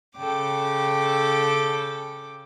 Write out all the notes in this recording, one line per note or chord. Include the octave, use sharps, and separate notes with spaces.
C#3 A4 G5 D6